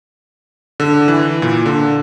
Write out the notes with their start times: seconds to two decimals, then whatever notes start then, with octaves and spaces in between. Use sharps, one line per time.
0.80 D3
1.08 E3
1.42 A#2
1.66 D3